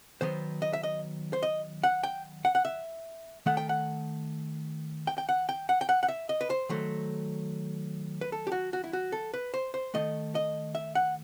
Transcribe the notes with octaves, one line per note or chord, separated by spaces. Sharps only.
D#3 F#3 B3 C5
D#5
E5
D#5
C5
D#5
F#5
G5
F#5
F#5
E5
D#3 A3 F#5
G5
F#5
G5
G5
F#5
G5
F#5
G5
F#5
F#5
E5
D#5
B4
C5
D#3 F#3 A3
B4
A4
G4
F#4
F#4
E4
F#4
A4
B4
C5
C5
D#3 A3 D#5
D#5
E5
F#5